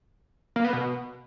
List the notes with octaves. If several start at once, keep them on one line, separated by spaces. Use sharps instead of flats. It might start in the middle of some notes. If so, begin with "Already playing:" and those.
A#3
B3
B2